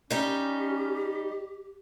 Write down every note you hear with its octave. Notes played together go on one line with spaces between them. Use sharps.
G3 C#4 D#4 G4